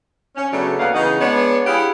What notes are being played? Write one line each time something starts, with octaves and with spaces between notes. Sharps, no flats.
C#4
C#3 F#3 A3 B3 C#4 D4
D2 A#3 B3 B4 F5
C#3 E3 B3 D#4
G#3 B3 D4 C#5
E4 G4 G#4 F5 F#5